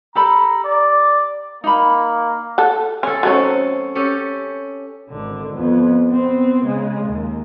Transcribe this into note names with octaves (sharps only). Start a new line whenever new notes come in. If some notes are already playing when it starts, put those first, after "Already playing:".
G4 A4 A#5 B5
D5
A#3 D#4 B5
A4 F#5
C#4 G#4 A4
F#3 A3 C4 C#4 D#4
C#4 G4 A4
G#1 D3
F2 B3
B3 C4
C#3 G#3
D#2